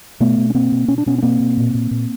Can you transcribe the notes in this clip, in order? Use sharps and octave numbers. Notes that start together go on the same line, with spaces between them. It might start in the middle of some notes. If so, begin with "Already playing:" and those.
B2 A3 B3
B2
C#4
B2 A#3 C4
B2
B2 C#4
D4
B2 B3 C#4
C#4
B2 A#3 C4
B2
A#2
A#2
A#2